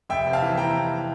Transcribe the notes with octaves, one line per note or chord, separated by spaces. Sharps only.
F1 E5 G5
C3
F5 A5
E3
E3 G5 A#5